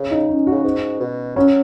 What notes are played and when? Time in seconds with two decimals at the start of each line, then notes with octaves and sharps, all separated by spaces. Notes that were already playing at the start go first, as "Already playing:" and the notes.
Already playing: C#3
0.11 D#4
0.29 C#4
0.47 C#3 F#4
0.64 G#2
1.00 B2
1.36 F#3 C#4